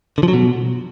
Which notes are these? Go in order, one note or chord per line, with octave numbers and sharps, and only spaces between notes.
D3
F3
F#3
B2